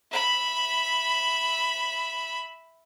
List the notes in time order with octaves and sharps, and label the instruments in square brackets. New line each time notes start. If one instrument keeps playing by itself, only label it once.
[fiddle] E5 B5